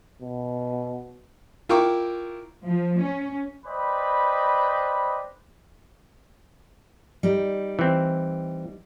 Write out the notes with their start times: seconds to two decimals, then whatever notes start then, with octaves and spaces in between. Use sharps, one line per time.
0.22 B2
1.69 E4 F4 A#4 G5 C#6 D6
2.66 F3
3.01 C#4
3.66 B4 C5 D5 D#5 G5 B5
7.23 G3 D#4
7.79 E3 C4